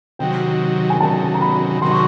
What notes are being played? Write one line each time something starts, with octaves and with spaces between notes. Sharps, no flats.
C3 D#3 F#3 G5
G#5
C3 D#3 F#3 A5
A#5
B5
C3 D#3 F#3 C6
C#6